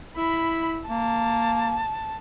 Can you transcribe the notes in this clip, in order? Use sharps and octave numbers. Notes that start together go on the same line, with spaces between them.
E4 B5
A#3 A5